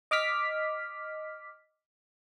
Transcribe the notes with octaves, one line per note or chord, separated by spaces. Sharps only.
D#5 D6 F6 B6